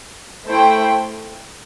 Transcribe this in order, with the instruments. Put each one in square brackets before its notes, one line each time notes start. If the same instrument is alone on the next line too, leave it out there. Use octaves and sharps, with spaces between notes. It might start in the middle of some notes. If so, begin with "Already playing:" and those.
[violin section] A3 E4 C5 G5